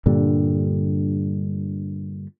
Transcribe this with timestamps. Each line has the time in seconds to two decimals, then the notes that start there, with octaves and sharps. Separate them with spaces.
0.06 G2 A#2 D3 G3